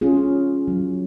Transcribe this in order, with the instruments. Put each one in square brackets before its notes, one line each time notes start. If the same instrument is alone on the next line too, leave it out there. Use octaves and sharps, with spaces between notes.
[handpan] C#4 F4 G#4
F#3